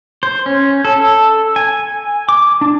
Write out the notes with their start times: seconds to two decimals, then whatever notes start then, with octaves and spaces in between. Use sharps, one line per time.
0.23 C5
0.46 C#4
0.85 A4
1.56 G#5
2.29 D6
2.61 D4